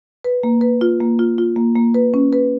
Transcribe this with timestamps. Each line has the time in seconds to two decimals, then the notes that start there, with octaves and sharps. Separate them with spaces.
0.24 B4
0.43 A#3
0.61 B4
0.81 F4
1.00 A#3
1.19 F4
1.38 F4
1.56 A#3
1.76 A#3
1.95 B4
2.14 C#4
2.33 B4